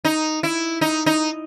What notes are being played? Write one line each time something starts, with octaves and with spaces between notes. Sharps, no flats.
D#4
E4
D#4
D#4